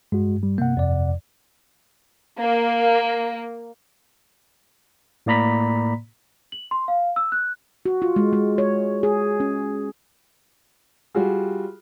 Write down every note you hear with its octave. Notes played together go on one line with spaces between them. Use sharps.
G2 G#3 F#4
G3
G2 C3 A#3 F#5
F2 D5
A#3
A2 A#3 D5 A#5 B5 B6
F#7
C6
F5
E6
F#6
F#4
F4
G#3
G#3
C#5
G#4
C#4
G3 F4 F#4 G#4